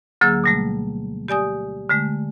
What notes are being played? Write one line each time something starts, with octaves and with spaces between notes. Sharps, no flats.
D2 D3 F#3 A#3 G#4 E6
B2 G3 A3
G4 D5 G#5 D#6
D3 G#3 A3